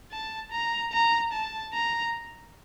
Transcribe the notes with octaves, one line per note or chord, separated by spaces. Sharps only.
A5
A#5
A#5
A5
A#5